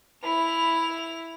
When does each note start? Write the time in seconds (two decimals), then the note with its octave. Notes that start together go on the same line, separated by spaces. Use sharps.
0.24 E4 F7